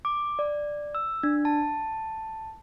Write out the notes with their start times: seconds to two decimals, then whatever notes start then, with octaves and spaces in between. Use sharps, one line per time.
0.05 D6
0.39 D5
0.95 E6
1.23 D4
1.45 A5